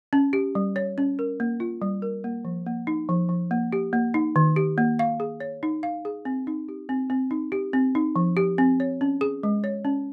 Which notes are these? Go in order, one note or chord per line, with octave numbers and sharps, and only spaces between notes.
C#4
G4
G3
C#5
C#4
A#4
A#3
F4
G3
A#4
A#3
F3
A#3
D#4
F3
F3
A#3
G4
A#3
D#4
D#3
G4
A#3
F5
G#4
C#5
D#4
F5
G#4
C4
D#4
G4
C4
C4
D#4
G4
C4
D#4
F3
G4
C4
C#5
C#4
G#4
G#3
C#5
C#4